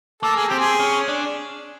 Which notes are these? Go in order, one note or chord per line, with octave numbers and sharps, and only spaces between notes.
A#3 A4
G#4
C4 G4
G#4
C#4
D4